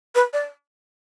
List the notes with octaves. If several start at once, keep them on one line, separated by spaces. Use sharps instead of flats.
B4
D5